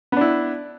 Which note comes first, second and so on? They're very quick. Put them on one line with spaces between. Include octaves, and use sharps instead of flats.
B3 D4 E4